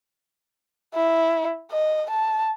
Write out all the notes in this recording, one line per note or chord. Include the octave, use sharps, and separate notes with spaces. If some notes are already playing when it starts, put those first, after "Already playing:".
E4
D#5
A5